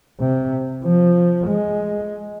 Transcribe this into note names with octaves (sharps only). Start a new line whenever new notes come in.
C3
F3
G#3